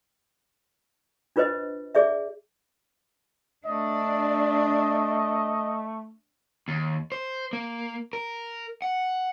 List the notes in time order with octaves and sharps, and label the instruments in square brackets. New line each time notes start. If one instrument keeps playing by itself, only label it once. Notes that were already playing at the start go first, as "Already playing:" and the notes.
[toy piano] D4 F4 B4 C5 D#5
G#4 D5 E5
[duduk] A3 [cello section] D4 [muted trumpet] D#5
[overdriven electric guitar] D#2
C5
A#3
A#4
F#5